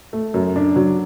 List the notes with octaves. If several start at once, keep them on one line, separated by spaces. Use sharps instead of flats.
A3
F#2
D4
F#3